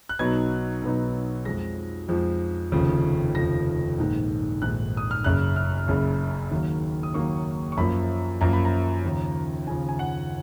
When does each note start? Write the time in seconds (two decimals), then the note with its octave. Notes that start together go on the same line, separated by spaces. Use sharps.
0.09 F#6
0.19 B1 B2 F#3 B3 D#4 G#6
0.82 B1 B2 F#3 B3 D#4
1.45 F2 F3 G#3 A#6
2.08 F2 F3 G#3
2.72 F1 D#2 C#3 F3
3.35 F1 D#2 C#3 F3 A#6
3.98 A#1 G#2 D#3
4.62 A#1 G#2 D#3 F#6
4.97 D#6
5.11 F6
5.24 F#1 F#2 C#3 F#6
5.56 F6
5.88 F#1 F#2 C#3
6.51 D#2 D#3 F#3 A#3
7.03 D#6
7.14 D#2 D#3 F#3 A#3 C#6
7.72 C#6
7.77 F#2 F3 A#3 B5
8.41 F#2 F3 A#3 A#5
8.53 B5
8.65 A#5
9.04 D#2 C#3 F3
9.67 D#2 C#3 F3 G#5
9.89 G#5
9.99 F#5